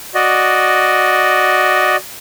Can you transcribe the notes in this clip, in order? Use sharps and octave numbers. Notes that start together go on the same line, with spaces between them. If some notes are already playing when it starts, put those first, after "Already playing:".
F#4 D5 D#5